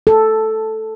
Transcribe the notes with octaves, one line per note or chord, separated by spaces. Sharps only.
A4